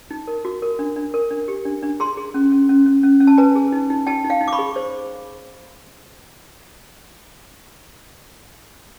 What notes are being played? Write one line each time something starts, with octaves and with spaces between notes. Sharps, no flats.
D#4
A#4
F#4
A#4
D4
D4
A#4
D4
G4
D4
D4
G#4 A#5 C6
G#4
C#4
C#4
C#4
C#4
C#4
C#4
A5
B4 G#5 A#5
G#4
D#4
D#4
D#4 G5 A5
D#4
F5 G5
D#4
D6
B5 C#6
G#4
C5